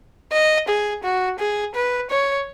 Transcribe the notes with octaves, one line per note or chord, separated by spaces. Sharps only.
D#5
G#4
F#4
G#4
B4
C#5